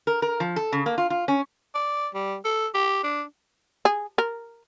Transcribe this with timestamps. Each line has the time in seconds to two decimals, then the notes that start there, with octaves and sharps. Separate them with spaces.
0.07 A#4
0.22 A#4
0.40 F3
0.56 A4
0.72 C#3
0.86 A#3
0.98 F4
1.10 F4
1.28 C#4
1.75 D5
2.14 G3
2.45 A4
2.74 G4
3.04 D4
3.85 G#4
4.18 A#4